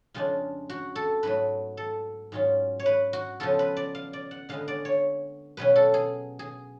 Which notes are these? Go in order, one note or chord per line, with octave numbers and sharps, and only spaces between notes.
F2 C#3 G#3 D4 F4
F#4
A4
G#2 F#3 A3 B4
A4
G#2 F#3 C#4 F4
C#5
B4
F#4
C#3 F3 B3 F4 A4
B4
D5
F5
D5
F#5
D3 G#3 B3 F5
D5
C#5
B2 F#3 C#4 B4
A4
G#4
G#4